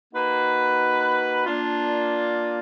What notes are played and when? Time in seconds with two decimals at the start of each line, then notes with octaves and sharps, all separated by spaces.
0.14 A#3 D#4 F#4 B4
1.46 A#3 D4 F4